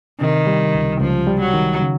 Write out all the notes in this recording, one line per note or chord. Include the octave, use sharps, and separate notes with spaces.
C3 D#3
G3
C#2
C#2 F3
G3
F#3
D#3
C#3